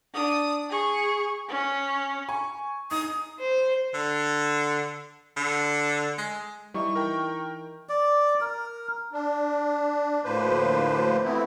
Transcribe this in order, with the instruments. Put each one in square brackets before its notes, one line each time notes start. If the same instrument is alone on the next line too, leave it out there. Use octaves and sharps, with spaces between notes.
[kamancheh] D4 D#6
G#4 C#6
C#4
[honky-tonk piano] G#5 C#6
[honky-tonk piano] D#4 [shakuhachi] D#6
[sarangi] C5
[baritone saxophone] D3
D3
G#3
[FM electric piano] E3 D#4 E4 [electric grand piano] G3 [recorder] C#6
[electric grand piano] A#4 G5
[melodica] D5
A#4
[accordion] D4
D2 A2 F3 A#3 B4 C5
E3 A3 B3 C4 E4